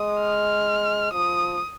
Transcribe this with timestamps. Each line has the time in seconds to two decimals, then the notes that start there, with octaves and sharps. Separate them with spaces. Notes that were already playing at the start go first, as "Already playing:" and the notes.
Already playing: G#3 D#6
0.21 F6
1.12 F3 D#6